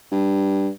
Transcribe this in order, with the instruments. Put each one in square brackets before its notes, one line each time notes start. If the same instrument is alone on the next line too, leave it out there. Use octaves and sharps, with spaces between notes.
[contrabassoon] G2